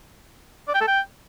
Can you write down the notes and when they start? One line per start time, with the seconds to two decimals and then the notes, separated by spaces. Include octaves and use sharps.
0.68 D5
0.74 G5
0.81 A4
0.87 G5